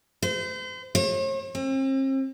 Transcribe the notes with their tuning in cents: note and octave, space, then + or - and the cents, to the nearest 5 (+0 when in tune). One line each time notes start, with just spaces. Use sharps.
C5 -40
C#5 -45
C4 +40